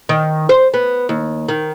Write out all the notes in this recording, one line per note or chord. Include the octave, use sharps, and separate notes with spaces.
D#3
C5
B3
D#2
D#3